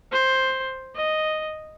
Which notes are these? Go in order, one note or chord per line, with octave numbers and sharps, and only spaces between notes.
C5
D#5